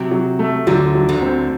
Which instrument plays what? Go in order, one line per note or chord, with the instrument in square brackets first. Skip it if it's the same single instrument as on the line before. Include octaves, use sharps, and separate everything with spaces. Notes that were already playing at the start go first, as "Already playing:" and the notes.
Already playing: [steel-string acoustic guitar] C3 [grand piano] F#3
[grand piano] F#3
A3
[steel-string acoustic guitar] D2 D3 [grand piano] F#3
[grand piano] F#3
[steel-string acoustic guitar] D2 D3
[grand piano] C4